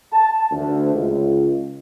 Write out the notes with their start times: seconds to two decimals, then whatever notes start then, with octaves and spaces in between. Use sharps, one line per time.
0.13 A5
0.51 D2
0.95 C#2